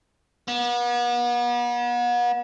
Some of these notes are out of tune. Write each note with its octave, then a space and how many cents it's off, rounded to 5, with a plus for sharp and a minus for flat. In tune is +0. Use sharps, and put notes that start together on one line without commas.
B3 -40